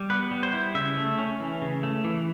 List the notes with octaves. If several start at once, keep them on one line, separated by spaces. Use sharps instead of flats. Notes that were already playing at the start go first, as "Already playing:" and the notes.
Already playing: G3
B3 B4
G3
C5
E4
C#3 E5
A3
C#4
E3
C#3
A3
E3